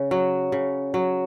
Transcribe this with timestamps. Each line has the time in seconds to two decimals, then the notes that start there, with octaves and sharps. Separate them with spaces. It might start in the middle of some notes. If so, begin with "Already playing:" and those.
Already playing: C#3
0.11 F#3
0.52 C#3
0.94 F#3